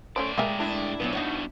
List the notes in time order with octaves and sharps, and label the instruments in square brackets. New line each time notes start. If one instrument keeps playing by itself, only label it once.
[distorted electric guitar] A2 D5 [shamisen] A3 C#4 C5
[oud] G#3 G4 A#4 [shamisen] A#3 E5 G#5
[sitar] D4 E4
[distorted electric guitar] A#2 [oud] F#3 A3 B3
[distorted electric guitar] G2 B2 [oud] D#4 F#4 C#5